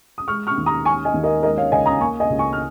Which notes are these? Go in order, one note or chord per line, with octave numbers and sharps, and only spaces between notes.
D#6
G#3 C#6 F6
C#6 F6
D#2
A#5 D#6
C#4 G#5 C#6
D#5 G#5
D#2
A#4 D#5
G#3 A#4 D#5
C#5 F5
C#2 D#5 G#5
A#5 D#6
A#3 G#5 C#6
D#5 G#5
C#2
G#5 C#6
F6